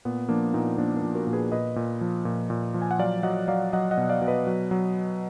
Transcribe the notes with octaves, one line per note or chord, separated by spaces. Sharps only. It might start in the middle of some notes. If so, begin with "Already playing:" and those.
A#2 B3
F3 A#3 D4
A#2 B3 D#4
F3 A#3 D4
A#3 D4
F3
F#4 A#4
A#2
G#4 B4
A#2 B4 D#5
A#2
F3
A#2
A#2
F3
G#5
F#5
F#3 D5 F5
F#3 D#5 F#5
F#3 D5 F5
F#3 D#5 F#5
D#5 F#5
B2
D5 F5
B2
B4 D#5
F#3
F#3